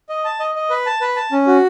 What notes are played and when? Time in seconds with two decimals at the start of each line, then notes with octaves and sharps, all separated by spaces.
0.09 D#5
0.25 A5
0.40 D#5
0.55 D#5
0.70 B4
0.86 A5
1.01 B4
1.16 A5
1.32 C#4
1.47 F#4